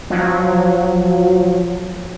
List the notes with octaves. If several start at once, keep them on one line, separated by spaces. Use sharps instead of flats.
F3 F#3